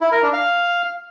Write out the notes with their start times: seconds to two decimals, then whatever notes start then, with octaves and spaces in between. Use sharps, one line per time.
0.01 E4
0.12 A#4
0.22 D4
0.33 F5